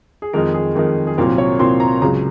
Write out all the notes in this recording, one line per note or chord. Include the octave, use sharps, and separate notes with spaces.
G#4
F2 D#3 G#3 D#4 A#4
G#4
F2 D#3 G#3 D#4
G#4
C2 A#2 F#3 C4 A#4
C#5
C2 A#2 F#3 C4 C6
A#5
C#2 C#3 F#3 A#5